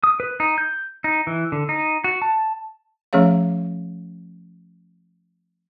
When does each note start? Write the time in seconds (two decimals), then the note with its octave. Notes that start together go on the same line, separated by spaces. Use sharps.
0.04 D#6
0.20 B4
0.40 D#4
0.58 G6
1.04 D#4
1.27 E3
1.52 D3
1.69 D#4
2.04 F#4
2.22 A5
3.13 F3 A3 C#4 G#4 C#5 F5